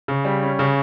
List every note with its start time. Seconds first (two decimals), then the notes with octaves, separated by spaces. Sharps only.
0.08 C#3
0.25 G3
0.43 C#4
0.59 C#3